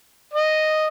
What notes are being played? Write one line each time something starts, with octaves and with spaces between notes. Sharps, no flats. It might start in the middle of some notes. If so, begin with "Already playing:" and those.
D#5